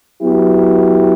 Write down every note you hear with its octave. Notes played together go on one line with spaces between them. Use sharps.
F#3 B3 E4 G4